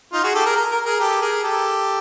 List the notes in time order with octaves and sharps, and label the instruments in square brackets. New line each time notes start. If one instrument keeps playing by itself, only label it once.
[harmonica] D#4 F4
F#4 G#4
G4 A4
G#4 A#4
A#4
A#4
G#4 A#4
G4 A4
G#4 A#4
G4 A4